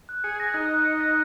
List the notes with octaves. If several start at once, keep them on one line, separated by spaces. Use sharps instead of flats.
F#6
G#4 C#7
A#6
D#4 F#6
F#6
C#7
A#6